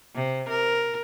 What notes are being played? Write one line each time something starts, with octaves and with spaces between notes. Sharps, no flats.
C3
A#4